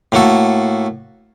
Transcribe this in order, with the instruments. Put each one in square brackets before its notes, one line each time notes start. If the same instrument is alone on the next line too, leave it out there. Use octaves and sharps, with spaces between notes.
[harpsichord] A2 A#3 F#4 A4